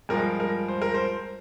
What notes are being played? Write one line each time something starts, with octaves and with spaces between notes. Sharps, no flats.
G2 F3 G#3 A#4
A#4
C5
A#4
C5